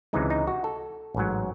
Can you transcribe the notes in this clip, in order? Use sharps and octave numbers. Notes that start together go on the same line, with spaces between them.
C#2 C3 E3 G#3 D#4
D#4
F#4
A4
A1 G#2 F#3